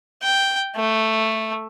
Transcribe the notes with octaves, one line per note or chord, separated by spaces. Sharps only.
G5
A3